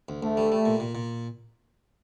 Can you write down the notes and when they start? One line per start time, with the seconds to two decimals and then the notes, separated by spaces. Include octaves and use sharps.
0.09 D2
0.23 D2 A3
0.37 G3
0.52 G3
0.65 A#2
0.80 A#2
0.95 A#2